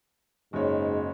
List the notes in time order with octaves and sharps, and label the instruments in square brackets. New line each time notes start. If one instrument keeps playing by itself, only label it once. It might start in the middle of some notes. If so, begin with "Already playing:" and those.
[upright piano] F#1 C#5 [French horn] G#2